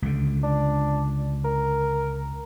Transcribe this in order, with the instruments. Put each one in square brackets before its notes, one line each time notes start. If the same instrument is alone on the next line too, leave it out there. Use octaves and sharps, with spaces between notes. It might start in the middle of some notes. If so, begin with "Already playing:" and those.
[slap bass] C#2 D3
[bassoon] D4
A#4